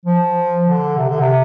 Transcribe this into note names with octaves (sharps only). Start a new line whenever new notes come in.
F3
D3
C3
D3
C3